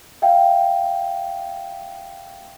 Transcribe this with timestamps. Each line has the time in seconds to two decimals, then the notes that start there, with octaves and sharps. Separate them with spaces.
0.22 E5 F5 G5